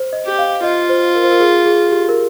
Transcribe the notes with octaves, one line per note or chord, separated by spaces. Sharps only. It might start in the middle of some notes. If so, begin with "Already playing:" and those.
Already playing: C5
D#5
G4
F5
F4 D#5
C5
A#4
C5
A#4
G#4
G#4
G4
A#4